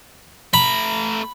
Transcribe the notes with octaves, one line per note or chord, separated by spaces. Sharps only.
A3 A#5 B5